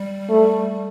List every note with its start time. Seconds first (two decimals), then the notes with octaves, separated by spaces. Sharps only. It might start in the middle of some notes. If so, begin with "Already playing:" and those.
Already playing: G3
0.29 A3